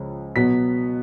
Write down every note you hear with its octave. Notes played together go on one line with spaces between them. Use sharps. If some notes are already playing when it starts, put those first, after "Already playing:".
Already playing: C#2 C#3 F3
B2 F#3 B3 B6